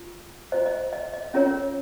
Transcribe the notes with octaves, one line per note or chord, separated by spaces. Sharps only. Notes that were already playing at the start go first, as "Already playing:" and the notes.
Already playing: F4
F4 C5 D#5
D#5
D#5
D#5
C#4 F4 A#4 C#5